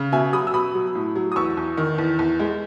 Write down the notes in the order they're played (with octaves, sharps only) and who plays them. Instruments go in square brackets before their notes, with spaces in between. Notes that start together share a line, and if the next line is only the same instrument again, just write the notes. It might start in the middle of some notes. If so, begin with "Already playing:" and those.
Already playing: [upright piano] C#3
B2 E5 G#5
F#3 B5 D#6
E6
B2 B5 D#6
F#3
A2
F#3
D#6
E2 C#6 E6
E2
D#3
E2
E2
G#3